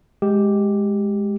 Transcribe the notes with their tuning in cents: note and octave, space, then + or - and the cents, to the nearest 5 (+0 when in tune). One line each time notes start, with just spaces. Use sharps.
G#3 +0 G4 +0